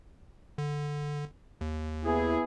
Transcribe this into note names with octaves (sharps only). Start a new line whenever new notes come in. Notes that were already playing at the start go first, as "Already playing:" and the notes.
D3
D#2
B3 E4 G#4